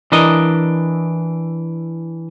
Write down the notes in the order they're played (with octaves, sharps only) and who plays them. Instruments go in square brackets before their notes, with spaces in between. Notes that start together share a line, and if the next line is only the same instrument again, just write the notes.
[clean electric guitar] E3 D4 A#4 D#5